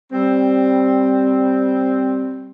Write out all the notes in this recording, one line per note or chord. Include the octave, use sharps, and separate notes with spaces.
G3 C4